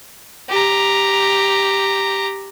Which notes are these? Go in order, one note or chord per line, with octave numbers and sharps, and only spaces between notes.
G4 A#5